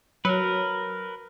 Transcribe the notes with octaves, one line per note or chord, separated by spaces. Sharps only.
F#3 A#4 B4